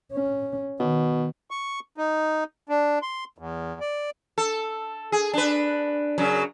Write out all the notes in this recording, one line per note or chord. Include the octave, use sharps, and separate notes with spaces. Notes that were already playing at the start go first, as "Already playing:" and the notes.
C#4
B2 D#3
C#6
D#4
D4
C6
E2
D5
A4
G#4
D4 B4
F#2 C#3 F#3